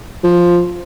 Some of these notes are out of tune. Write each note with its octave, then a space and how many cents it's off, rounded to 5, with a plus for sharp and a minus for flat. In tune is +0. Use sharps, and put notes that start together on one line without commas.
F3 +0